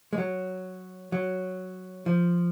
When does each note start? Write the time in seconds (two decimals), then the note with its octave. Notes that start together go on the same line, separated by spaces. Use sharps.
0.13 G#3
0.18 F#3
1.12 F#3
2.06 F3